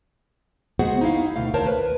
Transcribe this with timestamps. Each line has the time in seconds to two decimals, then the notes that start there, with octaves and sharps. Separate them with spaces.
0.79 G#3 B3 F#4 G#4 C5 F#5
1.01 D#4 E4 F5
1.36 D2 B2 A3 F5
1.54 D#2 A#4 C5 C#5 A5
1.66 B4